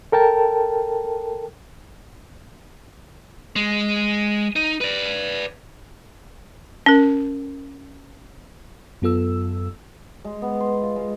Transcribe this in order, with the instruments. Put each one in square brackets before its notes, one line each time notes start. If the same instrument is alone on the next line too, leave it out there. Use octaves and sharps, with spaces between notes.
[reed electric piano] A4 A#4 G5 A5
[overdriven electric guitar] G#3
D#4
B4 D5
[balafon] C#4 A#4
[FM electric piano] F#2 B3 F4 A4 E6
[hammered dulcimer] G#3
B3
C6
F4
G#3